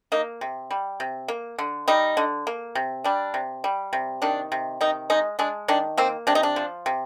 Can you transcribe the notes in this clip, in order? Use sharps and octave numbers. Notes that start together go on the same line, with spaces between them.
A#3 D#4
C3
G3
C3
A#3
D3
G3 D#4
D3
A#3
C3
G3 D4
C3
G3
C3
D#3 D4
C3
D#3 D#4
G#3 D#4
G#3 D4
D#3 D4
A#3 C4
C3 D4
D#4
D4
F3
C3